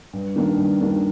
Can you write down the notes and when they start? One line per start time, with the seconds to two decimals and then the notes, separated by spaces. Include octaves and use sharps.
0.13 G2
0.36 D#3 A#3 D4
0.58 G2
0.81 D#3 A#3 D4